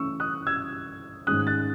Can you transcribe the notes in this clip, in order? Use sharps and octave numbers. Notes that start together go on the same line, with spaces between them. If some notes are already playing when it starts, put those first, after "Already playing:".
Already playing: C#3 E3 A3 C#4 C#6 E6
D#6 F#6
E6 G#6
G#2 D#3 G#3 C#4 D#6 F#6
F#6 A6